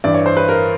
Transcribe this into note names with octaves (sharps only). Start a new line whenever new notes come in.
G2 E3 D5
C#5
C5
B4
A#4